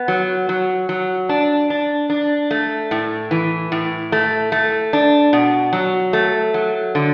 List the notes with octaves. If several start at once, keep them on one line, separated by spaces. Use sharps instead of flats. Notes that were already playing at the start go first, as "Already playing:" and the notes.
Already playing: B3
F#3
F#3
F#3
D4
D4
D4
A3
A2
E3
A2
A3
A3
D4
B2
F#3
A3
F#3
D3